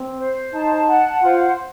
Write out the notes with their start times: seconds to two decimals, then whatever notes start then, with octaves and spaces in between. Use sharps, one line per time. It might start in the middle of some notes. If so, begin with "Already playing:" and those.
Already playing: C4
0.19 C5
0.53 D#4 A5
0.88 F#5
1.23 F4 C5